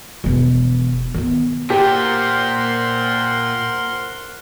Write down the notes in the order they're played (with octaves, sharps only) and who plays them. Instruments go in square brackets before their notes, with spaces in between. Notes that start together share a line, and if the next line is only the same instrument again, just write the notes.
[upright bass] E1 E3
D#3 B3
[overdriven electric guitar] A#2 [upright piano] G4 [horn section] A#4 F#5 C6 [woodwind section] C5